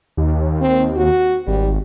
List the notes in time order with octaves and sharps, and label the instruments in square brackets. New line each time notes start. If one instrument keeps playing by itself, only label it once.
[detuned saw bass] D#2
[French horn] C4
F#4
[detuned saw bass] G#1 [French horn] G3